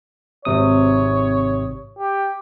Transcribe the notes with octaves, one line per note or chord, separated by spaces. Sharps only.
G#1 C3 C#5 D#6
G4